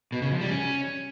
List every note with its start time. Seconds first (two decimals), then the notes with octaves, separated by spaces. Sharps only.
0.12 B2
0.22 C#3
0.32 F3
0.41 G3
0.51 C#4